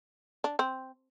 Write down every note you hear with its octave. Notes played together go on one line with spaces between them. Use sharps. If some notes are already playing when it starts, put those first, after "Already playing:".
D4
C4